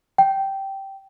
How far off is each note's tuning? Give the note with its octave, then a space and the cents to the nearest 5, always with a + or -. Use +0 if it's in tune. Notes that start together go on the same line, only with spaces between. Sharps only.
G5 -10